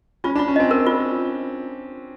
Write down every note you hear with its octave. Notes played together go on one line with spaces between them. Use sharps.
C#4 F4
D4
F4
C#4
C4 D#5
A#4
F4